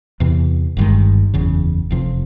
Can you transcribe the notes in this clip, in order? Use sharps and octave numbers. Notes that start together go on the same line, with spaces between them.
E2 C3 E3
G1 G2 D#3 G#3
F#1 E2 C#3
F1 F2 C3